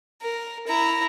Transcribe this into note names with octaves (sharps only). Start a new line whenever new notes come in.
A#4
E4 A#5